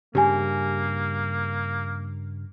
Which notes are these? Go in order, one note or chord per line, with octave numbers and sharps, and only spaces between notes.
G2 C#3 A#3 G4 G#5